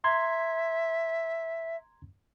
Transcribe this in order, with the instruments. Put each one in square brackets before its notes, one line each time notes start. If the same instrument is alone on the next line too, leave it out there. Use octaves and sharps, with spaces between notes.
[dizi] E5 [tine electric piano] A#5 C6 G#6